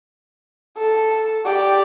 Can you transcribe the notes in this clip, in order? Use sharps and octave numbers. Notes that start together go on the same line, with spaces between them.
A4
G4 D5